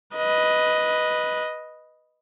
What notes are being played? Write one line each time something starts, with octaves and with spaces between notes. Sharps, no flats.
B4 D#5